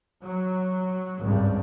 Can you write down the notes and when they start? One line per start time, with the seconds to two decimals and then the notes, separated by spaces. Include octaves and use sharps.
0.23 F#3
1.20 G#1 C#2 G2